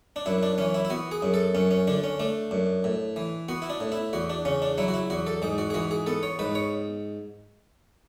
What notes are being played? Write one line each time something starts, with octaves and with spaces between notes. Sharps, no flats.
D4
F#2 E4
D4
E3 C#4
E4
E4
B3 F#4
G#4
F#2
A4
F#2 C#4
C#4
D3 D4
C#4
A3 D4
F#2
A2
E3
B3 F#4
E4
D4
A2
E4
E2 F#4
D4
C#3 C#4
D4
F#3 E4
F#4
E4
E2 F#4
A4
G#2 G#4
F#4
G#4
E3 F#4
G#4
B3 A4
C#5
G#2 B4
C#5